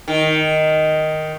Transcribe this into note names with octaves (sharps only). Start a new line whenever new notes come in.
D#3